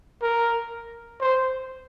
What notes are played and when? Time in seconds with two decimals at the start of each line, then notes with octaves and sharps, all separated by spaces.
0.23 A#4
1.21 C5